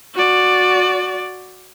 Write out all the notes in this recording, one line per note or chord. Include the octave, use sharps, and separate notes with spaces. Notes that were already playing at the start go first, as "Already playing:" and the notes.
F#4 D5